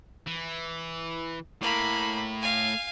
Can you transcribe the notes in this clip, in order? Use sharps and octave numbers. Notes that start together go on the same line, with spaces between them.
E3
A2 A#3 B5
F5 G#5